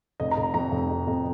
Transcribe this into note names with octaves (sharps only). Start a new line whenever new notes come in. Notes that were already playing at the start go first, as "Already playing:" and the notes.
F1 D#5
A#5
F1
A#5
F2 A#5
F1
F1
F2